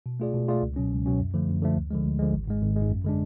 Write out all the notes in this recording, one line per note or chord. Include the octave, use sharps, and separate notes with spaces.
B2
A3 F4 G#4 D5
B2
A3 F4 G#4 D5
C#2
B2 F#3 C#4
C#2
B2 F#3 C#4
F#2
D3 F3 A3
F#2
D3 F3 A3
D2
D3 F3 G#3
D2
D3 F3 G#3
G#1
G#2 G#3
G#1
G#2 G#3
F#2
D3 G#3 D4